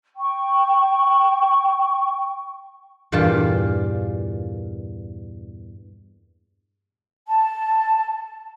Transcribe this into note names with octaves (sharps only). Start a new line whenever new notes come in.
G5 C#6
E2 G2 A#2 F4 G5 A5
A5